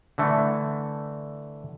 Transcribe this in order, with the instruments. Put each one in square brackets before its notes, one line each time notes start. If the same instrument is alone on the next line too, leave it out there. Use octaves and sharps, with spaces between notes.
[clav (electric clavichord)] D3 E3 A3